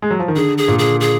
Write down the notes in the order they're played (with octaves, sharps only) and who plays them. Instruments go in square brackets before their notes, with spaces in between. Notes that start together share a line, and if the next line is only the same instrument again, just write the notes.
[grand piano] G#3
F#3
F3
D#3
[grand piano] D3 [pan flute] G#4
[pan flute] G#4
[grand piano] A#2
[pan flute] G#4
G#4